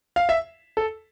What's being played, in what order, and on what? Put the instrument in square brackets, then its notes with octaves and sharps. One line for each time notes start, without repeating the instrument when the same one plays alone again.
[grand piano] F5
E5
A4